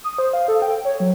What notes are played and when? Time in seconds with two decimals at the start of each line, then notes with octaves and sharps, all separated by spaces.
0.04 D#6
0.18 C5
0.33 F5
0.48 A4
0.62 G5
0.85 C#5
1.00 F#3